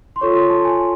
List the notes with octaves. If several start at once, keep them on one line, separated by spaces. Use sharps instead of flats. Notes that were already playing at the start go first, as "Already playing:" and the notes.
C6
F4 A4 C#5 C#6
C6
A5
G#5